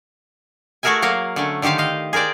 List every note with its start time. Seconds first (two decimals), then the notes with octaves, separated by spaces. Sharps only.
0.83 A3 F#4 G#4 A#4 E5 G#5
1.02 F#3 A#3 A#4 F5
1.36 D3 A3 C#4
1.62 D3 D#3 G4 C5 F5
1.78 D#5 F5
2.13 G#4 A#4 C5 D5 G5